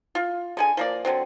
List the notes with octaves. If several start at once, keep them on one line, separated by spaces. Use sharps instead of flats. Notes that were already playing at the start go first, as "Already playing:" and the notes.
F4
D3 G#4 G#5
F3 A#3 D5
D3 F#3 C4